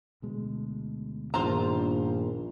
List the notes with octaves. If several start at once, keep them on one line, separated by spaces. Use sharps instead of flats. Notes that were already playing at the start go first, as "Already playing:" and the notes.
D2 B2 G#3
A#1 G2 D#3 B3 F4 C5 A#5